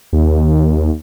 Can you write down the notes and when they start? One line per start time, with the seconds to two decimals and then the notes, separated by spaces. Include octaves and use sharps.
0.13 D#2